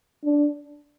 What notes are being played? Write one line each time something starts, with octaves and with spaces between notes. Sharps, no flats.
D4